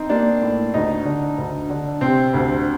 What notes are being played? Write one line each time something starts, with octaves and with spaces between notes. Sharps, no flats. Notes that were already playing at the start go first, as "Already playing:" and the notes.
Already playing: C4 D#4
A#3 D4
A2
D2 D#4
D3
D2
D3
C3 C4
D2